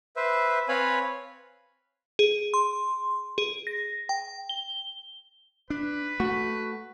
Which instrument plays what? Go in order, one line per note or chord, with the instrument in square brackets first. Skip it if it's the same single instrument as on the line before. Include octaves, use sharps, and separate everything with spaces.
[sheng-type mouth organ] B4 C5 E5
C4 B4 C#5 F5 G#5 B5
[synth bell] G#4
C6
G#4
A#6
G5
G7
[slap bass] D4 [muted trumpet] B4
[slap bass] A3 [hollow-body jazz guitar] F#4